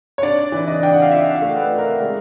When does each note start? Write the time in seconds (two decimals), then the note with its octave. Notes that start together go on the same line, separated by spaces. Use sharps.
0.18 C#5
0.23 D4 D5
0.52 E3
0.68 D#5
0.82 D4 G5
0.93 F#5
1.02 F5
1.11 F4 E5
1.35 F5
1.42 A3
1.56 B4
1.71 F4
1.78 A#4
2.02 G#3